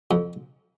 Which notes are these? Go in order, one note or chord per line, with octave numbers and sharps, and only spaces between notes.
F2